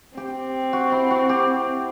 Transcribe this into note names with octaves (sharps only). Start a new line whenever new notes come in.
C4 G4
F#4
E4
F#4
G4